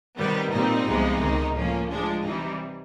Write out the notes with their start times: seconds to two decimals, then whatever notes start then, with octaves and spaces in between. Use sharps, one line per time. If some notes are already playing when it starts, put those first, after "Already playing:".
0.18 C3 D#3 G3 B3
0.52 A#2 G3 C4 D#4
0.87 C2 C3 F3 G#3 B3
1.22 C#2 C3 D#3
1.56 A2 F3 A#3 C#4
1.90 A2 F3 G#3 D4
2.24 C3 E3 G3 D#4